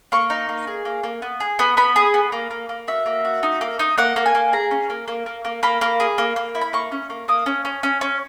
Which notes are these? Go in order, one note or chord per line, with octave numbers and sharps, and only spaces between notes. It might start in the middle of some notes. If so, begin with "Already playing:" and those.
A#3 C#6
D#4
A#3
G#4
A#3
A#3
B3
G#4
B3
B3 B5
G#4
B3
A#3
A#3
A#3
F#4 E5
A#3
F#4
D#4
A#3
D#4
A#3 F#5
A#3
G#5
A#3
G#4 A#5
C#4
A#3
A#3
A#3
A#3
A#3 B5
A#3
G#4
A#3
A#3
E4
B5
A#3 C#6
C#4
A#3
A#3 D#6
C#4
C#4
C#4
C#4